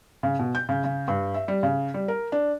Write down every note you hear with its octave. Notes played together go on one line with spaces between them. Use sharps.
C#3
B2
G6
C#3
C#3
G2
E5
G3
C#3
G3
A#4
D4